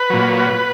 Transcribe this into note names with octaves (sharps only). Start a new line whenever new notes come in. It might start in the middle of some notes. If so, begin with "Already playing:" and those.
Already playing: B4
A#2 F#3